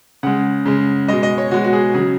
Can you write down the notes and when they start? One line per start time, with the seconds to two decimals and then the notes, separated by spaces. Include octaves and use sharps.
0.23 C#3 G#3 F#5
0.66 C#3 G#3
1.08 B2 G#3 D#5
1.23 D#5
1.38 C#5
1.51 B2 G#3 F#4
1.64 F#4
1.73 G#4
1.94 C#3 F#3 G#4